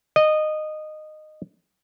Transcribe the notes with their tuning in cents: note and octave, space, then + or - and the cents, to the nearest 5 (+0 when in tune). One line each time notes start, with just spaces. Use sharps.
D#5 -15